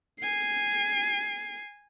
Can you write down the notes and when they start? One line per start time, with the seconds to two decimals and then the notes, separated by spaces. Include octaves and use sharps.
0.20 G#5 C7